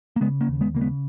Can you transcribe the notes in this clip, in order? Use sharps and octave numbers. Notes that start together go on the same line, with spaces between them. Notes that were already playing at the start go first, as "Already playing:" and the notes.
A#3
C#3 G#3 B3
A#3 C#4
D#2
G#3 B3
C#3 A#3
G#3 B3